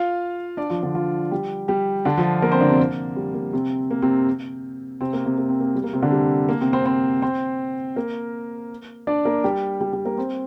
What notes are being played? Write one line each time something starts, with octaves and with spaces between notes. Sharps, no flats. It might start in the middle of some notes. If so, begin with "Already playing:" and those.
Already playing: F4 F5
D4 D5
F3 F4
D3 D4
F3 F4
G3 G4
G3 G4
D3 D4
F3 F4
A#3 A#4
C4 C5
D3 D4
C3 C4
A#3
G3
A#3
C3 C4
A#3
C3 C4
C3 C4
A#3
C3 C4
A#3
C4
A#3
G3
A#3
C3 C4
D3 D4
G3
A#3
C3 C4
C4 C5
C4 C5
C4 C5
A#3 A#4
D4 D5
A#3 A#4
G3 G4
G3 G4
G3 G4
A#3 A#4
C4 C5